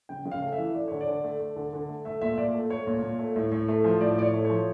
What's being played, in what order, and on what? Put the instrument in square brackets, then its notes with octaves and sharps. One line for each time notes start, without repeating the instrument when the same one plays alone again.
[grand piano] C#3 G5
C#3
F5
A3
E5
E3
A3 D5
D3 C#5
D5
D3
A3
A3
D3
D3
A3
A3 E5
A#2 E5
A#2 D5
A3
A3 C#5
A#2
A#2
A3
A2
A2
A3
F3
A2 D5
A2 D5
C#5
A3
F3 C#5